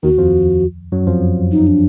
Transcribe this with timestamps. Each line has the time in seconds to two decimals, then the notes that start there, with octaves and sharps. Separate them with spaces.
0.03 D#2 D#3 F#4
0.18 F2 F3
0.92 F#2 F#3
1.07 F2 F3
1.52 D#4
1.67 D4